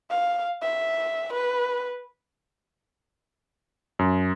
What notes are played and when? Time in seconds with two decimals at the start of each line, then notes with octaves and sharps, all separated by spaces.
0.10 F5
0.62 E5
1.34 B4
3.99 F#2